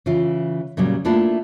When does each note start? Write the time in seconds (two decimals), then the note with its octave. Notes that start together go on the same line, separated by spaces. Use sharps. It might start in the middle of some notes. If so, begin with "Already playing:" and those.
0.06 C#3 E3 F4
0.77 A#2 C#3 F#3 G3
1.05 A3 A#3 D4 E4 F4